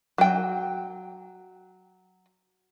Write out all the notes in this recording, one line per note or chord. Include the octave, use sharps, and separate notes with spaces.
F#3 G5